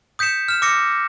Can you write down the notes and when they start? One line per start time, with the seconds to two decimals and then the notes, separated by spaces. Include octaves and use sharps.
0.19 D#6 G6 B6 C#7 E7
0.48 F6 E7
0.62 D6 E6 A#6 C#7